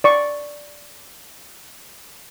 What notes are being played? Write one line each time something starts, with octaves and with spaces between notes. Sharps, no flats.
D5 C#6